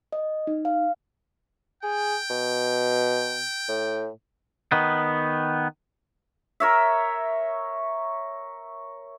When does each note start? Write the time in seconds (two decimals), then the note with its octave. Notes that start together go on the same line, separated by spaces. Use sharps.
0.12 D#5
0.47 D#4
0.65 F5
1.83 G#4 G5
2.30 B2
3.69 A2
4.72 D#3 B3
6.60 A#4 C#5 E5